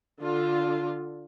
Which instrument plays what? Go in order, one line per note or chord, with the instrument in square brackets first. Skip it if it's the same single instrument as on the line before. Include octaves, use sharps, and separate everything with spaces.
[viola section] D3 F4